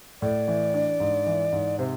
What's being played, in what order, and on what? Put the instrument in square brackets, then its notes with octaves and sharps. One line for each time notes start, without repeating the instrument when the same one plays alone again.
[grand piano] A2 [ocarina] D5
[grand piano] E3
D4
G#2
E3
G#2
[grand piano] C3 [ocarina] C5